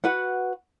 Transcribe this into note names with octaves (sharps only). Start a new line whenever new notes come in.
F#4 B4 F#5